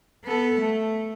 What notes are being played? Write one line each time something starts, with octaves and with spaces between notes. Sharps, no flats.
B3 A4
A3